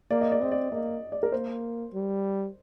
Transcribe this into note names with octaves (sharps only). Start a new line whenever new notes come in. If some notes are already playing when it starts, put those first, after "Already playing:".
A#3 D5
D#5
D5
C4 D#5
D5
A#3 D#5
D5
A#4
A#3 C5
G3